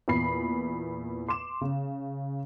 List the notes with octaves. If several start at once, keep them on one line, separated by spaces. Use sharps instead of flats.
E2 A#2 B5 C7
C6 D6 E7
C#3